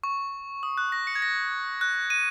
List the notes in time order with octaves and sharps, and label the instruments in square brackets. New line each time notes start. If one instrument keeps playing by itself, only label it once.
[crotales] C#6
D#6
F#6
A#6
C#7
G#6
A#6
F#6
D#7